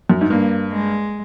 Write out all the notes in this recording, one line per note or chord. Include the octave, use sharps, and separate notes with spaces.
F#2
G#2
G2 A#3
G#3